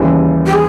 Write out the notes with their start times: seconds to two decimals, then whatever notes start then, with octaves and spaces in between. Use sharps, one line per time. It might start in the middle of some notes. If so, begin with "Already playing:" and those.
Already playing: D#2 C#3 E3 G3
0.46 G4
0.53 G#4